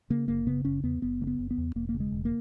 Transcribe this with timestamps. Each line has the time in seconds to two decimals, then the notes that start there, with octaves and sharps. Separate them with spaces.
0.10 C#3 A#3
0.28 F#1 A#3
0.47 C#3 B3
0.65 F#1 C#4
0.84 E2 B3
1.02 F#1 B3
1.21 C#3 A#3
1.27 B3
1.39 F#1
1.51 B3
1.58 E2
1.76 E1 A#3
1.89 A#3
1.94 C#3
2.00 G#3
2.12 E1
2.25 A#3